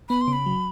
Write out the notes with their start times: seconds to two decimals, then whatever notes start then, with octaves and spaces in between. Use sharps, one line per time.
0.09 B3 B5
0.21 C6
0.28 C#3
0.33 B5
0.46 F#3